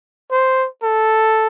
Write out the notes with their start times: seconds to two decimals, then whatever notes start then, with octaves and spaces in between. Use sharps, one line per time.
0.31 C5
0.83 A4